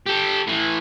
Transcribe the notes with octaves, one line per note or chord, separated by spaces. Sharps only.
G4 A4
A2 E3